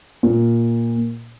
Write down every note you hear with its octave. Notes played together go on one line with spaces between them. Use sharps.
A#2